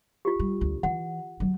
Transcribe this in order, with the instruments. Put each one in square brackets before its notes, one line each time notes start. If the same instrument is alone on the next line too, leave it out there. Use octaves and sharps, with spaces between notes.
[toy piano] F4 G4
[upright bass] G3
D2
[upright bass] E3 [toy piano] F#5
[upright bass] F#3 A3